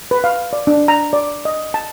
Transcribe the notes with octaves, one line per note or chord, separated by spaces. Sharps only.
B4
F5
D5
D4
A#5
D5
D#5
A5